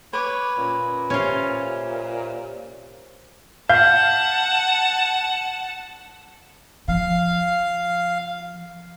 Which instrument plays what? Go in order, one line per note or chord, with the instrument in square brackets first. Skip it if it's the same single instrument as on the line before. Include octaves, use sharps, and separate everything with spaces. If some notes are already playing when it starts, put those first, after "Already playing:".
[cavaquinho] B4 D6 [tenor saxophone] C#5
[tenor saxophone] A#2 [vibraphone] C#4
[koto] C#4 F4 [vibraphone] G4 C5 E5
[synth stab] F5 [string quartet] F#5 A5 [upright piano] G6
[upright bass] F3 [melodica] F5